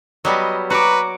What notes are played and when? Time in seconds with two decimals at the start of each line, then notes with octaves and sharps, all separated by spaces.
0.25 F#3 G3 B3 D#5
0.70 F#4 B4 A#5 C#6 D6